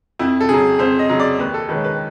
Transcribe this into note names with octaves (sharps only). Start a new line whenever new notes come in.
F2 E4
A4
C#3 F#3 G#4
F2 C5
D#5
C#3 F#3
D5
D#2 B4
A4
D#3 G#3 C#4 B4
B4